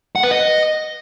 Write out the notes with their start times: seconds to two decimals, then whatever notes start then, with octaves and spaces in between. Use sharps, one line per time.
0.16 F#5
0.23 B4
0.31 D#5